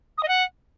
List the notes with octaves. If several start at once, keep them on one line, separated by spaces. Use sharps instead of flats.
D#6
D#5
F#5